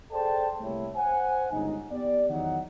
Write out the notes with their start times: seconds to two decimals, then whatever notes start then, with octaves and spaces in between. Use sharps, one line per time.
0.11 G#4 A4 C5 D5 G5 A5
0.61 C2 A3 A#3 E4 G4 C#5
0.96 C5 F#5 G#5
1.52 G1 C#2 D#4
1.91 B3 G4 D5
2.30 E2 D#3 F#3 D#4 F#5